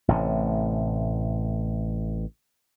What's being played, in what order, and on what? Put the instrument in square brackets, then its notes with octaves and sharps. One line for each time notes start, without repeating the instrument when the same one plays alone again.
[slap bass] A1 A2 C3